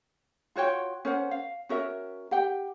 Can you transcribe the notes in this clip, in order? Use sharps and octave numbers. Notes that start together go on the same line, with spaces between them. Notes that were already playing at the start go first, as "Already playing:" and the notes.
F4 F#4 C#5 G5
C#4 A#4 C5 F#5
F5
C#4 F#4 A#4 E5
G4 F#5 G5